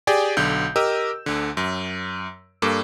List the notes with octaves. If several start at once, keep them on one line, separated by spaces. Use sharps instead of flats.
G4 G#4 D5 G5 G#5
B1 D3 G6
G4 A#4 D#5 E6
D2 D3
F#2
G2 A#3 A4 D6